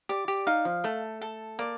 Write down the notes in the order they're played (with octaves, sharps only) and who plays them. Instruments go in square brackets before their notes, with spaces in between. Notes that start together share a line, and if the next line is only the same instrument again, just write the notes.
[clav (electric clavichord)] G4 [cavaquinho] D5
[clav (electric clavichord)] G4
[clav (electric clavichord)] D#4 [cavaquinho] F5
[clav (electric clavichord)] F3
[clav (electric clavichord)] A3 [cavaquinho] A4
[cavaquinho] A4
[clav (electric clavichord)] A#3 [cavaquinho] D5